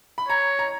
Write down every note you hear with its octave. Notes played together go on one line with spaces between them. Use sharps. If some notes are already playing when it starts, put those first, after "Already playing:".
B5
C#5 A#5
A#5